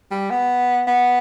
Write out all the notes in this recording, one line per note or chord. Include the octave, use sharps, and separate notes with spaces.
G3
B3
B3